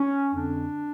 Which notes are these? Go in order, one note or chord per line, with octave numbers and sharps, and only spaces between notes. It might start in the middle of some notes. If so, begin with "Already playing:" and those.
Already playing: C#4
F2 D3 D4